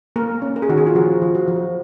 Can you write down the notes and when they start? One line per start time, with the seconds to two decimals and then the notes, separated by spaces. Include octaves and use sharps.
0.16 A#3 A#4
0.42 C#4
0.56 A#4
0.62 G#4
0.69 D#3 F#4
0.78 G#4
0.87 F4
0.95 F3 F#4
1.22 F3
1.35 F#4
1.48 F3